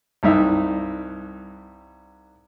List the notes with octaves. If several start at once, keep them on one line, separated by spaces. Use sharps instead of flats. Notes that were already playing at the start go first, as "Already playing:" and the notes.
C2 G2 D#4 E5